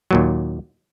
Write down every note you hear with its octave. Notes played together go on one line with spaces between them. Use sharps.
D#2 A#2 F#3